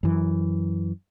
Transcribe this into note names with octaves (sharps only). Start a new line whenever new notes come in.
F#2 E3